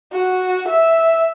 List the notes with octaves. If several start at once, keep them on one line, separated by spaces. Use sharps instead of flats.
F#4
E5